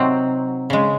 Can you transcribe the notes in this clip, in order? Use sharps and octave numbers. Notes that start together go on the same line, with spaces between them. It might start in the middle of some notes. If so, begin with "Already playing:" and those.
Already playing: C3 F#3 C4 D#4
C#3 G#3